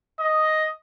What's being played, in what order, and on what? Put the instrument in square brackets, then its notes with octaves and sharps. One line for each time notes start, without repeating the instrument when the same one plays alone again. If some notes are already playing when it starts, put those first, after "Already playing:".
[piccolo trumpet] D#5